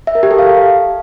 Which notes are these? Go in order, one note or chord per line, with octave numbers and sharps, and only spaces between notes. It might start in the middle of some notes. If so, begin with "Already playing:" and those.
E5
A#4
G4
A4
F5